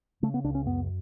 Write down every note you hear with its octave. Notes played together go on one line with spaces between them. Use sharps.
C#3 A3
B3
C#2 D4
C#4
F#2 B3